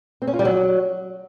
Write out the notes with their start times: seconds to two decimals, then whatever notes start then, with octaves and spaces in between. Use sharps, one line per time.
0.22 C4
0.27 C#4
0.33 F4
0.39 G3
0.45 F#3